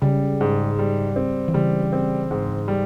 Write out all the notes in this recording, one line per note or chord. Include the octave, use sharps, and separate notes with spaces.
C#3 G3
G#2
G3
C4
E3
C#3 G3
C4
G#2
G3